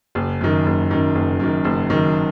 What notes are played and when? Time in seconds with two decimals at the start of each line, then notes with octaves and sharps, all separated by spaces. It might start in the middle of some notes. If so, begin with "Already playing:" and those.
0.15 F#1
0.41 F#2 D#3
0.66 F#1
0.91 F#2 D#3
1.15 F#1
1.40 F#2 D#3
1.65 F#1
1.90 F#2 D#3